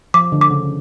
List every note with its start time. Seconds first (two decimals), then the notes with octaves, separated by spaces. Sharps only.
0.14 F3 D6
0.32 D3
0.41 D6
0.50 C#3